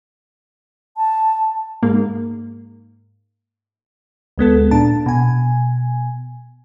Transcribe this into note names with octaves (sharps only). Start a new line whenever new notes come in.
A5
G#2 A#3
D2 G#3 B3 A4
A#2 D4 A5
B2 G#5